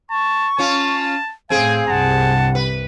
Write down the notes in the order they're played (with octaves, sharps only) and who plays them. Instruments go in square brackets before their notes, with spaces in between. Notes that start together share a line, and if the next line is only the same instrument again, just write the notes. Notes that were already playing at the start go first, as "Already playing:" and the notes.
[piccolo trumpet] A5 [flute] C#6
[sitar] C#4 F4 [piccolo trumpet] A5
[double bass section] A2 [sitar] C4 G#4 [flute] F5 [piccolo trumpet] G#5
[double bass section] C2 G2 C3 [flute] F#5 [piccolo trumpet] A5
[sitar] B4